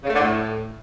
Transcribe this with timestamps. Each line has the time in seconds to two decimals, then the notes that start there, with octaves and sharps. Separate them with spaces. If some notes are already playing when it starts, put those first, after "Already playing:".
0.04 C#3
0.09 A3
0.15 D3
0.20 A2